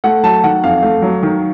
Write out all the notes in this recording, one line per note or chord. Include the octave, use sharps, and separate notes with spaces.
A3 F#5
F#3 A5
D#3 F#5
F2 F5
A3
F#3
D#3